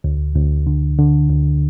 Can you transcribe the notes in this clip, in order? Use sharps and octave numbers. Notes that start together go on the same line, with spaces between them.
D2
D2
D3
D3
D2